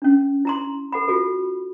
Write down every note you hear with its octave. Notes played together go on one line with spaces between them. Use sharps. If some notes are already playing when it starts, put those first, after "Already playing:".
C#4 D4
E4 A#5 C6
A4 F#5 B5
F4 F#4 G#4 A4